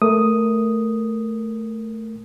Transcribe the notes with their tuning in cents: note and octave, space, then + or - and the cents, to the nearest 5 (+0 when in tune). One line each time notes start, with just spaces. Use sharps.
A3 +0 A#4 +0 D#6 +0